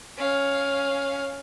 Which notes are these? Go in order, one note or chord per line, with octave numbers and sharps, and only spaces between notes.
C#4 F5